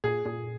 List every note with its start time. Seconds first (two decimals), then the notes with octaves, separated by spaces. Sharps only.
0.04 A#2 G#4
0.25 A#2 G#4